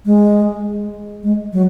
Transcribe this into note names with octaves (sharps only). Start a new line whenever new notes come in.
G#3
G#3
F#3